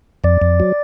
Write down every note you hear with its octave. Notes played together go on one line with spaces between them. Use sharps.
F2 D5
F2
F#3